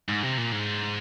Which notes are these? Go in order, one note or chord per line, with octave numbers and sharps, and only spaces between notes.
G#2
C3
A#2
G#2